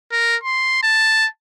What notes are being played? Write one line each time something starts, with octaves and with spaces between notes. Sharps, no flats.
A#4
C6
A5